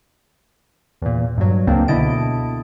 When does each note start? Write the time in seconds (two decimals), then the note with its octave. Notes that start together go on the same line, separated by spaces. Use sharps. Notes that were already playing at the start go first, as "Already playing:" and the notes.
1.02 E2 A#2
1.38 G2 F#3
1.67 C#2 F#2 A#3 C4 D4
1.88 B2 D3 E4 D#5 A5 D7